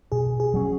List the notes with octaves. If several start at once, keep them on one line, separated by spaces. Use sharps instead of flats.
B2 G#4
G#4
F#3 C#4